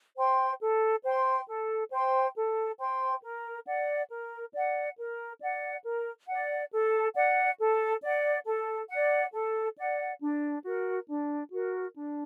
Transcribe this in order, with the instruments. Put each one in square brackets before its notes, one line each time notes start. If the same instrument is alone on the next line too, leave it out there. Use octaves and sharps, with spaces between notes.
[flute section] C5 G5 C6
A4
C5 G5 C6
A4
C5 G5 C6
A4
C5 G5 C6
A#4
D5 F#5
A#4
D5 F#5
A#4
D5 F#5
A#4
D5 F#5
A4
D5 F#5
A4
D5 F#5
A4
D5 F#5
A4
D5 F#5
D4
F#4 A#4
D4
F#4 A#4
D4